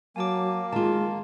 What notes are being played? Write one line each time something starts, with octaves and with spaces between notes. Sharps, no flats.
F#3 A#3 G#5 A5 D6
D#3 G#3 F4 A5